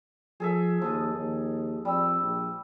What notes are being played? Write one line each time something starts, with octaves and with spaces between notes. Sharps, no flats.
F3 G#4 A4 E5
D#2 F3 D#6
D#2
F2 G3 E6
A#1